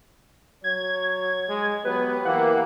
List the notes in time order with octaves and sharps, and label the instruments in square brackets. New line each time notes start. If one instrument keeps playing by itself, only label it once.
[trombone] F#3 [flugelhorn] C#5 [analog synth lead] G#6
[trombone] G#3
[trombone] F#3 [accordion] B3 [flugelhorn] G4 [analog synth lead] B4
[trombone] E3 [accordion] A#3 [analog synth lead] F#5